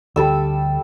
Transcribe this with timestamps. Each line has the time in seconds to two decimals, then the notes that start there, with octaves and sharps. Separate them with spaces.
0.16 D2 D3 G3 A4 E6